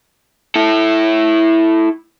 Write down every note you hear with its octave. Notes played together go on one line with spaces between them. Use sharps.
E4 A4